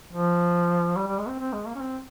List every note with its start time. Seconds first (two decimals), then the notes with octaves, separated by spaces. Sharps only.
0.13 F3
0.97 G3
1.07 G3
1.18 G#3
1.28 C4
1.39 C4
1.53 G#3
1.67 A#3
1.75 C#4
1.81 C4